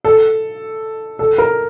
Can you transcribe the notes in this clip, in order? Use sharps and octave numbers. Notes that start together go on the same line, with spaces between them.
A4
A4
A#4